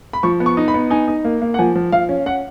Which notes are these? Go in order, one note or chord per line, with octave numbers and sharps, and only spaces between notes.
B5
F3 C#6
B3
C#6
D#4
B5
B3
D#4 G#5
D#4
A#3
A#3
F#5
F3 G#5
F3
F3 F5
C#4
C#4 F#5